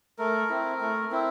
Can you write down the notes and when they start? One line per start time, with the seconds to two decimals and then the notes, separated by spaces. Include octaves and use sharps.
0.19 A3 A#4
0.49 C4 E4
0.81 A3
1.11 C4 E4